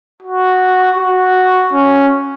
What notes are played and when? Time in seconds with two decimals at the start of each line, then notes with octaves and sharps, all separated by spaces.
0.23 F#4
0.98 F#4
1.74 C#4